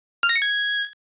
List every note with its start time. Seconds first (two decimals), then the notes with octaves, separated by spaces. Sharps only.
0.23 F6
0.29 A#6
0.36 C#7
0.42 G#6